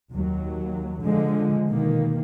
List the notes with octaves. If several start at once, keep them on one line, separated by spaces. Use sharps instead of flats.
D#2 F#3
D3 F3 G#3
B2 D#3 A#3